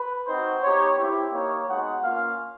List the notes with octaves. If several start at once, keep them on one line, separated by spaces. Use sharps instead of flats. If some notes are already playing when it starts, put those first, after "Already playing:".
Already playing: B4
C4 D#4 F#4 C5
B3 D#4 G4 C#5
C4 E4 G4
A#3 D#4 G4 C#5
G#3 B3 D#4 F#4 F#5
A#3 C#4 F4 F5